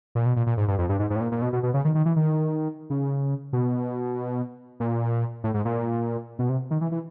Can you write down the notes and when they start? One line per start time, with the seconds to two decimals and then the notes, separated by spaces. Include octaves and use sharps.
0.15 A#2
0.26 B2
0.36 A#2
0.47 A#2
0.57 G#2
0.68 G2
0.78 F2
0.89 G2
0.99 G#2
1.10 G#2
1.16 A2
1.21 A#2
1.32 A#2
1.42 B2
1.53 B2
1.63 B2
1.74 C#3
1.85 D#3
1.95 D#3
2.05 E3
2.16 D#3
2.90 C#3
3.53 B2
4.80 A#2
5.44 A2
5.54 G#2
5.65 A#2
6.39 B2
6.49 C3
6.71 D#3
6.81 E3
6.92 E3